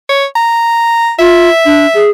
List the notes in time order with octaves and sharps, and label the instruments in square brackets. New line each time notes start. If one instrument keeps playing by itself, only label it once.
[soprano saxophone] C#5
A#5
[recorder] F4 [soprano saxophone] E5
[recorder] D4
G#4